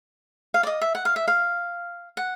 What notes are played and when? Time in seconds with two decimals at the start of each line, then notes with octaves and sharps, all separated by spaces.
0.54 F5
0.63 D5
0.67 D#5
0.81 E5
0.95 F#5
1.05 F5
1.16 E5
1.28 F5
2.17 F#5